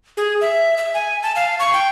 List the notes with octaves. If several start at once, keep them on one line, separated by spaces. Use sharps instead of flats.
G#4
E5
E5
G#5
A5
F5
C#6
G5